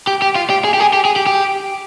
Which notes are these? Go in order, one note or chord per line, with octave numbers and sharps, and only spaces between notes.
G4
G4
F4
G4
G#4
G4
G#4
G4
G#4
G4
G4